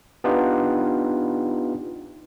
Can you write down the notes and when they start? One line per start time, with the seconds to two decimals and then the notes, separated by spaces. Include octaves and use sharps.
0.24 B3 D4 D#4 F4 G4